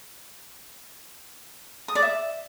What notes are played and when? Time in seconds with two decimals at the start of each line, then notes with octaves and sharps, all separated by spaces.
1.88 D#6
1.95 D5
2.02 E5